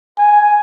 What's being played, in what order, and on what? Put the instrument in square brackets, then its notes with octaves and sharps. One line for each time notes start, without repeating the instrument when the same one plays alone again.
[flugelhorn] G#5